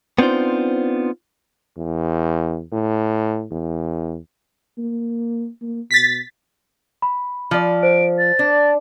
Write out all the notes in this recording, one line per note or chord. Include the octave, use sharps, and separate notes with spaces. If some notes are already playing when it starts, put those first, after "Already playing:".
B3 C4 D4 D#4 F4 C5
E2
A2
E2
A#3
A#3
B2 A6 B6
B5
F3 D5
C5 D7
A6
D4